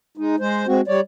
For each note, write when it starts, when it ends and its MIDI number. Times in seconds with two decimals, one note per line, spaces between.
0.17 0.36 56
0.17 0.36 63
0.40 0.67 56
0.40 0.67 72
0.67 0.81 56
0.67 0.81 60
0.67 0.81 66
0.88 1.01 55
0.88 1.01 73
0.88 1.01 74